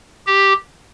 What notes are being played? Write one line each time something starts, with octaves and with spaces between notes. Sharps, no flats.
G4